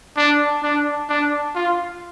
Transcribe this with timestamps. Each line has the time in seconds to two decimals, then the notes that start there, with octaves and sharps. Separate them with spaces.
0.17 D4
0.63 D4
1.09 D4
1.55 F4